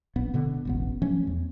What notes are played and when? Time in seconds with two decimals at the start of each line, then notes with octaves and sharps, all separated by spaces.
0.16 D1 A#1 B3
0.34 B2 D3 B3
0.65 E1 A1 B3
1.02 F3 F#3 A3 C#4
1.27 E2